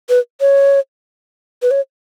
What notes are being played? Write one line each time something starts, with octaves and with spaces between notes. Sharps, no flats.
B4
C#5
B4
C#5